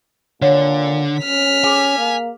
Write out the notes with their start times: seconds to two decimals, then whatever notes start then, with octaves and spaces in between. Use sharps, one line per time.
0.42 A#2 D3 C#5 F5 F#5
1.21 C#4 F6 B6
1.64 G#4 G#5 D6
1.98 A#3